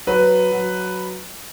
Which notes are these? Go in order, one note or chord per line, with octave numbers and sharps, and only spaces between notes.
F#3 B4
F#3